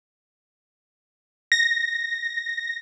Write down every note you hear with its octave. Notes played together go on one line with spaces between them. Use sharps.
A#6